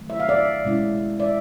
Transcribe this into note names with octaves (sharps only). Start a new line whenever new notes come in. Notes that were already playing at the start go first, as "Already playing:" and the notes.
Already playing: D#3 F#3 A3
E5
F5
D5 E5
B2 G#3 C#4 E4
D5 E5